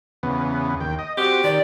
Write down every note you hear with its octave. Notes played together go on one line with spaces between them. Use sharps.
E2 C#3 B3
D#2 G5
D#5
C4 F#4 G4
D#3 D5